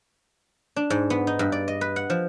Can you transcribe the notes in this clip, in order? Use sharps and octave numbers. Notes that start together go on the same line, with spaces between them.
D4
G#2
B3
D#4
G2
D5
D#5
B4
F#5
F3